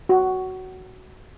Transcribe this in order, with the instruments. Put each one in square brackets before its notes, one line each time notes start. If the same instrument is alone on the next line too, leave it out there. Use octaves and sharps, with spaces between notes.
[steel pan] F#4